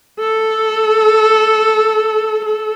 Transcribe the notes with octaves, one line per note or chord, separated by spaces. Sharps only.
A4
A4